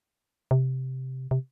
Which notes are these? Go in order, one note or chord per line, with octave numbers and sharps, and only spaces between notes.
C3
C3